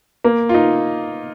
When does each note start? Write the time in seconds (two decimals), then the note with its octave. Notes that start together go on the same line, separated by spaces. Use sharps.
0.24 A#3
0.49 F4
0.54 D#4